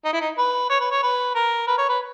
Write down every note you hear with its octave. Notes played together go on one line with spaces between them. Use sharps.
D#4
E4
D#4
B4
C#5
B4
C#5
B4
A#4
B4
C#5
B4